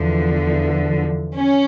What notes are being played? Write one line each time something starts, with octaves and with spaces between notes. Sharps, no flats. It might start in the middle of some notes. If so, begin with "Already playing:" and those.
Already playing: E2 D3 F3
C#4